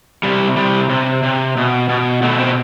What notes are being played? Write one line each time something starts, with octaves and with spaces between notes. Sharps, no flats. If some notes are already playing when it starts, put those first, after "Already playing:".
C3 G3
C3 G3
C3
C3
B2
B2
B2 A3
C4